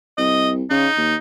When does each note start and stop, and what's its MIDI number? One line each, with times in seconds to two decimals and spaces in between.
0.18 0.63 36
0.18 0.51 75
0.70 0.87 49
0.70 1.16 63
0.97 1.15 39